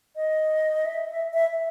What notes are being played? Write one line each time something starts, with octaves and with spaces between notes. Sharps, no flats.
D#5
E5
E5
E5